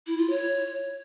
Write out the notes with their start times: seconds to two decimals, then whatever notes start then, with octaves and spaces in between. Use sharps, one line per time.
0.07 E4
0.18 F4
0.30 C#5